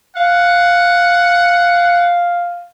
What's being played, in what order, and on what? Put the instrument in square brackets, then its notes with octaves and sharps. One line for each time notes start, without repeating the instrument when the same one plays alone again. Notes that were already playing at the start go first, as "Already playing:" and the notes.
[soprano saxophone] F5 [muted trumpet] F#5